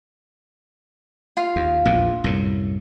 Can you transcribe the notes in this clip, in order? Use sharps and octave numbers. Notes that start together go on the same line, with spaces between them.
F4 F5
D#2
A#1 E2 A#2
C2 F#2 A2